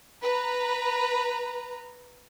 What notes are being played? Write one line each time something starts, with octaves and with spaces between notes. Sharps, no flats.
B4 A#5